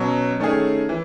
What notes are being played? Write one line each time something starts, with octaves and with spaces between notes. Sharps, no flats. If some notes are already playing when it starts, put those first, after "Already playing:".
Already playing: B2 F#3 C#4
D#3 A3 C#4 G#4
E3